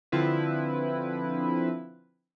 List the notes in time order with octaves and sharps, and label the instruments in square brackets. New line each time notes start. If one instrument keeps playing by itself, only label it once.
[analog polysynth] D3 F3 C4 E4 B4